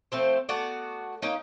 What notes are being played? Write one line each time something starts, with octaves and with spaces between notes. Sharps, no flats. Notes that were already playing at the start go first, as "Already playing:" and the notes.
F3 A3 C4 C5
A3 B3 F#4 D5
A#3 C#4 D#4